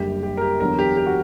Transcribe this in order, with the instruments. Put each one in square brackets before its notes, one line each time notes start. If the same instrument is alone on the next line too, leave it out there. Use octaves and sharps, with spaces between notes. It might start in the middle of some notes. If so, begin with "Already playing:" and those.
Already playing: [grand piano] F#1 F#2 D3 G3 G4
G4
A#4
G4
E2 D3 F#3 A#4
G4
G4
F#4